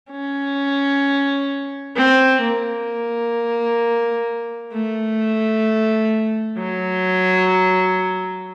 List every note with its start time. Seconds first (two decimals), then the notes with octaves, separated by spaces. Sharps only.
0.11 C#4
1.96 C4
2.41 A#3
4.73 A3
6.58 F#3